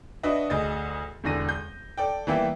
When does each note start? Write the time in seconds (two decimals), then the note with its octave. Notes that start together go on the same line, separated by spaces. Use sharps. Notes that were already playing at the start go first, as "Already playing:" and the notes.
0.23 D4 F#4 B4 D#5 E5
0.50 D2 G#4 D#5 A6
1.24 E1 E2 D3 A#6 D#7
1.49 G6
1.98 A4 D5 G5
2.27 E3 G3 A#3 B3 G4 E5